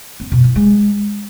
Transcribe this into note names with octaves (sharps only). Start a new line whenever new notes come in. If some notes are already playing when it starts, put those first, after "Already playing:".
C4
B2
E4
G#3